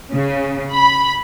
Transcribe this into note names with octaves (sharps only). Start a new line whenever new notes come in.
C#3
B5